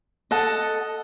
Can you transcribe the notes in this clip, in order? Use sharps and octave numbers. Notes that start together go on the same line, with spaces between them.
A4 D#5 F#5